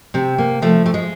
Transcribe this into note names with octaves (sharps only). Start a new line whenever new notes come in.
C3 C4
A#3
F3 A3
A3
G#3